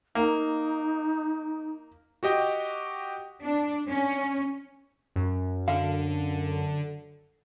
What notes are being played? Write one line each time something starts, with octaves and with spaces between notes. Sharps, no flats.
A#3 D#4
F#4 G4 D#5 G5
D4
C#4
F#2
D3 F5